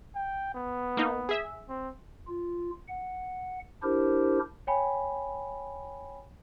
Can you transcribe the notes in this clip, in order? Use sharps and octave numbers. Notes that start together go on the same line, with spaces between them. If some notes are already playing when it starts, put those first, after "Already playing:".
G5
B3
A#3 D#4
G#4 E5
C4
F4
F#5
D4 E4 G4 A#4 C5
C#5 G5 G#5 B5